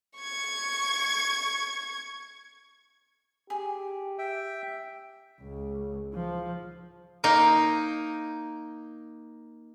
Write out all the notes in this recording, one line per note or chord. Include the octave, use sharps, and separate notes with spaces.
C#6 G#6
G4 G#4
E5 G5
C#2
F3
A#3 D#4 G5